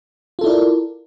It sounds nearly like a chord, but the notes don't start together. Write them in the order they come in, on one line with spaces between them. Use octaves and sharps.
F4 A4 E4 D5 A#4